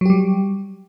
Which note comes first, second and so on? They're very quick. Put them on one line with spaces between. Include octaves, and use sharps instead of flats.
F#3 G4 G3